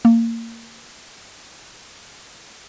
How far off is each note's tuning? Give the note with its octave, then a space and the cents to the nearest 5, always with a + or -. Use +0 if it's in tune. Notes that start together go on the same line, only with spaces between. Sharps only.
A#3 -25